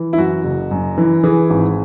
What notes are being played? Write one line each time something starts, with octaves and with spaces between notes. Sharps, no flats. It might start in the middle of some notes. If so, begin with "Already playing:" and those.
Already playing: E3
E4
F#2 F#4
F#1
F#2
E3
E3 G#4
G#1